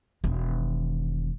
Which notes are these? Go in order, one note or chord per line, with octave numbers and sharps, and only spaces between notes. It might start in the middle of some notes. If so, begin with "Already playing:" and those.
E1 D#3